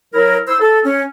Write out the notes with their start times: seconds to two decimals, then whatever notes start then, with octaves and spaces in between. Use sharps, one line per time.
0.13 F#3 E4 A#4
0.47 E4 C5 E6
0.60 A4
0.85 C#4